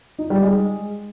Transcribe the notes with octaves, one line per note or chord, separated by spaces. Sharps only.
D#4
G3
G#3